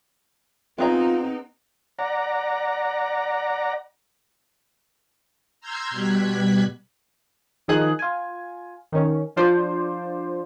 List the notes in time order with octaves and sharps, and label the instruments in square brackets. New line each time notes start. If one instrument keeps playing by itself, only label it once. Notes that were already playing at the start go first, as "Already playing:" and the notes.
[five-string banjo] B3 G#4 A#5 [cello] C4 D#4 [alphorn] F4
[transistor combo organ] D5 F#5 A#5
[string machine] A#5 C6 E6 F6 G6 G#6
B2 G3 F#6 G#6 B6
[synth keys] D#3 F3 D#4 G#4 D#6 F#6
F4 G#5
D#3 C#4
F3 D4 F4 C5 D5